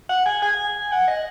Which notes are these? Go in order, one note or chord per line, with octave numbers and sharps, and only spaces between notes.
F#5
G#5
G#5
F#5
D#5